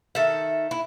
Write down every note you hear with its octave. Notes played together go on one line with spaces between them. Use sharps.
D#3 A4 E5
E4